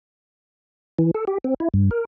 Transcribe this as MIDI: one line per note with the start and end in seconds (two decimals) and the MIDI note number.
0.99 1.11 52
1.15 1.25 69
1.27 1.38 67
1.44 1.54 60
1.60 1.68 64
1.74 1.90 43
1.91 2.05 70